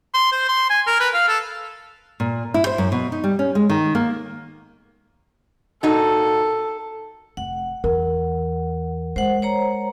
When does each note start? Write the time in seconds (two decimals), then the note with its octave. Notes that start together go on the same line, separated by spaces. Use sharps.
0.14 C6
0.32 C5
0.49 C6
0.70 G#5
0.87 A#4
1.00 B4
1.14 F5
1.28 A4
2.20 A#2
2.54 E4
2.66 C5
2.78 F#2
2.92 B2
3.12 D#4
3.24 G3
3.39 C#4
3.55 G#3
3.70 D#3
3.95 A#3
5.83 A#2 D#4 F#4 A4
7.37 F1 F#5
7.84 E2 A#4
9.16 G#3 C5 F#5
9.42 C5 C#5 A#5